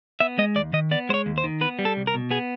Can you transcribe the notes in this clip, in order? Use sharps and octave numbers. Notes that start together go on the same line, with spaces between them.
B3 E5
G#3 D#5
D#2 D5
D#3 D#5
B3 D5
G#3 C5 C#5
D#2
C5
D#3
B3 B4
G3
A4
C2
A#4
B2
B3 G#4